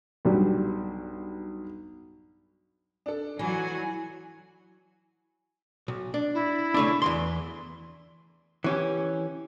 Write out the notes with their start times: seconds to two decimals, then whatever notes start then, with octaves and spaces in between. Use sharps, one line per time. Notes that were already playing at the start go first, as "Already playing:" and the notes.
0.25 B1 G2 F#3 G3
3.06 D4 A4
3.39 E3 F#3 F#4 G#5
5.88 B1
6.14 D4
6.34 E4
6.74 C#3 A3 D4
7.02 E2 E3 C6
8.64 E3 C#4 G4